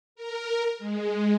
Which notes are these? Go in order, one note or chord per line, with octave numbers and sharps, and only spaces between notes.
A#4
G#3